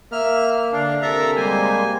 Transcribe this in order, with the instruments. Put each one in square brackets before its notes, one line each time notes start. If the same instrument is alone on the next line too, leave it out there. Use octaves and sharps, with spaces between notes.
[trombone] A#3 [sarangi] E5 [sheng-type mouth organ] F6
[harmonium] D3 [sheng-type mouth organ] D4 [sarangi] F5
[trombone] C3 [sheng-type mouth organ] A4 E5 A#5 [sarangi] A#4
[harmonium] G3 G#3 A#3 [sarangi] C5 [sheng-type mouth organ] G#5